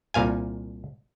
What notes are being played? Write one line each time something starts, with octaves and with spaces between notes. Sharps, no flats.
C2 A#2 F5 G#5